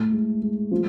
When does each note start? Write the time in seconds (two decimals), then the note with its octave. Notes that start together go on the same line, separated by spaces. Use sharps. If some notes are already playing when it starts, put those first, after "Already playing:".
Already playing: A2 A3
0.12 G#3
0.42 G#3
0.71 F3